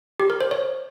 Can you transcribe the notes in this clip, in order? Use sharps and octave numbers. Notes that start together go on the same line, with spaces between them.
G4
A#4
C5
C#5